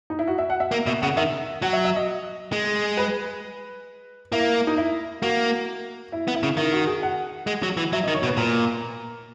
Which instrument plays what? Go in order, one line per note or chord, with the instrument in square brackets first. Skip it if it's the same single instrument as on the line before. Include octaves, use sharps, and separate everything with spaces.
[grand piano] D#4
E4
F#4
E5
F#5
E5
[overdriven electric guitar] A#3
[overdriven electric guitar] B2 [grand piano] E5
[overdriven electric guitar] C#3 [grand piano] F#5
[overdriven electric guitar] D#3 [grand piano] E5
[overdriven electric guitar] F#3 [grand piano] F#5
[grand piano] E5
E5
D#5
[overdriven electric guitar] G#3
[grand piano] B4
[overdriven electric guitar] A#3 [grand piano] E4
[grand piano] D#4
E4
[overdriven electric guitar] A#3 [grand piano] F#4
[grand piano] E4
[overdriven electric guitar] B3
[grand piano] E4
[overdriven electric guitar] C#3
[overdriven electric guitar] D#3 [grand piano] E4
[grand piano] F#4
G#4
F#5
[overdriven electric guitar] G#3
F#3
E3
[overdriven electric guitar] F#3 [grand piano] E5
[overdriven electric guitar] D#3 [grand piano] D#5
[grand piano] C#5
[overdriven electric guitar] B2
[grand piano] B4
[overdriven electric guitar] A#2 [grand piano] A#4